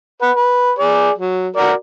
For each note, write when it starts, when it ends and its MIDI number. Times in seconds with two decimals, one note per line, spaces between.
0.22 0.31 71
0.22 0.31 78
0.36 0.72 71
0.79 1.10 68
0.79 1.10 74
1.18 1.49 54
1.56 1.72 66
1.56 1.72 70
1.56 1.72 74